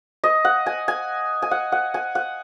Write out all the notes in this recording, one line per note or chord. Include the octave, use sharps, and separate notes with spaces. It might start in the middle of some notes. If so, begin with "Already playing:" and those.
D#5
F#5
G#5
G#5
G#5
F#5
F#5
G#5
F#5